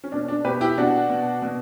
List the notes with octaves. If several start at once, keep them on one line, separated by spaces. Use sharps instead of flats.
C#4
B2 D4
D4
B2 G4 B4
E4 G4
B2 D4 F#4
B2
B2